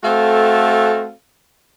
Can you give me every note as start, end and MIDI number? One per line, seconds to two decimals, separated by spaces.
0.04 1.12 57
0.04 1.12 60
0.04 1.12 66
0.04 1.12 69
0.04 1.12 77